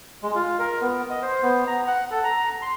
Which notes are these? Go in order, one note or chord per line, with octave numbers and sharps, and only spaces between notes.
G#3
F4
A#4
B3
D#5
C5
B3
A#5
F#5
A4
A#5
C6